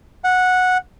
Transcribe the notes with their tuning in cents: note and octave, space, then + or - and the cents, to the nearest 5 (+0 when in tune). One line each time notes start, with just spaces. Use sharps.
F#5 -10